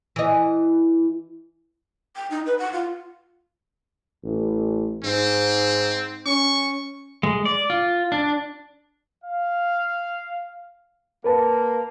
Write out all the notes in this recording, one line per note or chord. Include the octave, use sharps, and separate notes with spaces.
E3 D#5
G5
D#4
B4
F#5
F4
A1
G#2 C4
C#4 C#6
G#3
D5
F4
D4
F5
A#3 A#4 B4 A5